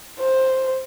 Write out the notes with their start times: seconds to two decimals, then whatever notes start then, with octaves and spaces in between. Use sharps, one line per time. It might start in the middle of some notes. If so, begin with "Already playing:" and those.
0.20 C5